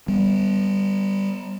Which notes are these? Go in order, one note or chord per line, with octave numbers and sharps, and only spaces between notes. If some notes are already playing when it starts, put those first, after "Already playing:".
G3 B3